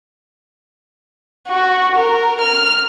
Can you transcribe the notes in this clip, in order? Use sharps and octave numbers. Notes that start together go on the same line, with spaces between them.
F#4
A#4
F6